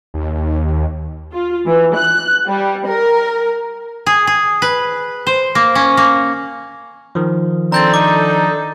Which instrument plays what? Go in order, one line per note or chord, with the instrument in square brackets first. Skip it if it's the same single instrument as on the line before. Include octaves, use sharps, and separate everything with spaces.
[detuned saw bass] D#2
[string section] F4
E3
F#6
G3
A#4
[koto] G#4
G#4
B4
C5
A#3
C#4
A#3
[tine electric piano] D#3 F3
[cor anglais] C4 [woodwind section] D4 A4 [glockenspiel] A#5 G6 A6
[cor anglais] D#4 [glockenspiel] D6